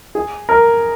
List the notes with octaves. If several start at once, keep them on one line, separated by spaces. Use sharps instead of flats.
G#4
A#4